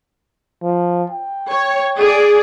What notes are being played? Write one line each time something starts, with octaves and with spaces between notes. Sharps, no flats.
F3
G5
C#5
G#4 D5